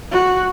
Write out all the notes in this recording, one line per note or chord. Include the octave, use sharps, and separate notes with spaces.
F#4